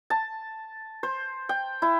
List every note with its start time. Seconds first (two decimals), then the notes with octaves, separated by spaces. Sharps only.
0.10 A5
1.03 C5
1.49 G5
1.82 E4